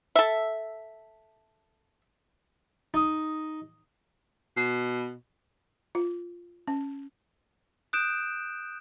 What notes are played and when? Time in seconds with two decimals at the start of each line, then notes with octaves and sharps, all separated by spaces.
0.15 A4 E5
2.94 D#4 D#6
4.57 B2
5.95 F4
6.67 C#4
7.93 D#6 F#6 G6 D7 E7